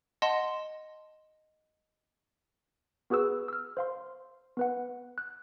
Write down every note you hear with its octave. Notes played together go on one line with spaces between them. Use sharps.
D#5 F#5 A5 C6
B3 F#4 G#4 B4 E6
E6 F6
C5 F5 C6
B3 B4 F#5
F#6